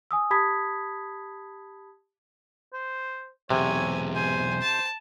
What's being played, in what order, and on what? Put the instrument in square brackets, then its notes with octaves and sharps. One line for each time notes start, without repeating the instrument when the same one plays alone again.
[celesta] G#5 D#6 E6
G4 A5 B5 D#6 G#6 B6
[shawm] C5
[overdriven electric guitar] B1 E2 [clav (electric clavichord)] C3 [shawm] C#5 [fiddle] G#5
[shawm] C5 [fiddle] G#5
[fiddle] A5